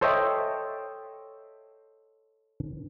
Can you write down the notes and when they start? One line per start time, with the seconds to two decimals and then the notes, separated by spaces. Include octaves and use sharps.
0.01 A4 C5 C#5 D#5 E5 G5